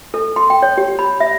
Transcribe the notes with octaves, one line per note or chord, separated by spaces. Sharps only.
A4
C6
G5
C#5
G4
B5
E5